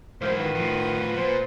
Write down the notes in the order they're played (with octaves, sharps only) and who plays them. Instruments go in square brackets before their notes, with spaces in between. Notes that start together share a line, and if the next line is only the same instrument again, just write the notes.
[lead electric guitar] G#2 E3 [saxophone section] F#3 A#3 C5 [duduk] E4
[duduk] D#3 [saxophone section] F4 F#4 B4
[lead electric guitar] A2 F3
[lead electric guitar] A#2 [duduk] C5